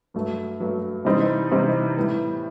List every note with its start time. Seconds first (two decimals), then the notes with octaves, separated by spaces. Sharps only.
0.14 G2 F#3 A3
0.60 G2 F#3 A3
1.05 C3 E3 G3 C4 D#4
1.51 C3 E3 G3 C4 D#4
1.96 A2 G3 B3